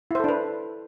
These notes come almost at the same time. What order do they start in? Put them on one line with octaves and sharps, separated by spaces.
E4 C5 A4 D4 B4